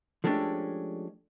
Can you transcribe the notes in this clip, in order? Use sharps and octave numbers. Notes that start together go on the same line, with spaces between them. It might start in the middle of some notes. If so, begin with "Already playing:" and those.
F3 G#3 A3 C#4 D4 G4